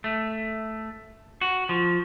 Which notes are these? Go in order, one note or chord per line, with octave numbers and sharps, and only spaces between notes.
A3
F#4
F3